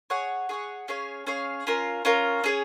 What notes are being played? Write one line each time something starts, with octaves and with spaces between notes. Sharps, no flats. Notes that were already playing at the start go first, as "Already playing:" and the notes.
G#4 C#5 F#5
G#4 C#5 F#5
C#4 G#4 C#5 F5
C#4 G#4 C#5 F5
C#4 F4 A#4
C#4 F4 A#4
C#4 G#4 C#5